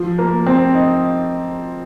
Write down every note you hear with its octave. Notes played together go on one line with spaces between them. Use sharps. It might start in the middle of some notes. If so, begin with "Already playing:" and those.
Already playing: F3
A#3
C4
D#4